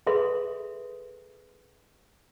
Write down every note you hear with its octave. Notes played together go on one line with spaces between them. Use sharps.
G#4 A4 B4 E5 C6